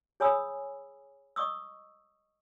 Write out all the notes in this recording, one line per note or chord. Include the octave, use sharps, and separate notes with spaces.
G#4 C#5 G#5 B5 D#6 E6
D#5 C#6 D#6 E6